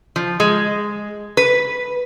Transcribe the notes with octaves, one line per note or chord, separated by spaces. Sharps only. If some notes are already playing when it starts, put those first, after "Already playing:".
F3
G#3
B4